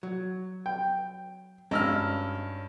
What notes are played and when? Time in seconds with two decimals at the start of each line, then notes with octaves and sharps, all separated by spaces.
0.03 F#3
0.66 G5
1.71 G#1 G2 C#4 D#4 E6 F6